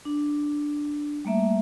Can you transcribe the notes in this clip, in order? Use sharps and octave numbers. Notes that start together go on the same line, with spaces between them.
D4
G3 A3 A#3 E5